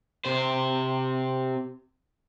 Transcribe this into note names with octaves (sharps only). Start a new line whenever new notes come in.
C3 C5